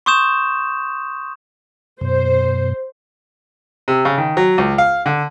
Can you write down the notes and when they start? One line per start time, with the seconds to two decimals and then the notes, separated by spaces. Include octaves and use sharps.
0.06 C6 C#6 D#6 G6 E7
2.01 F#2 B2 C5
3.88 C3
4.05 C#3
4.18 D#3
4.37 F#3
4.58 C#2
4.78 F5
5.06 D3